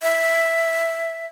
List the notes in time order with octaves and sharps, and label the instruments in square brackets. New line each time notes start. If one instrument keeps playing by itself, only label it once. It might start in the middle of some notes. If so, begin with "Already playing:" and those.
[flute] E5